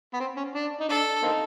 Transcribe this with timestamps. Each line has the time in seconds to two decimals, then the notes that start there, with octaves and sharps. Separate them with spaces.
0.14 B3
0.20 C4
0.37 C#4
0.55 D4
0.81 D#4
0.89 D4 A4
1.23 A#3 C4 D#4